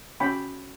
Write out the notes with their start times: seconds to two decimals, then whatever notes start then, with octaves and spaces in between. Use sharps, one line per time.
0.20 C#4 F#4 G5 B5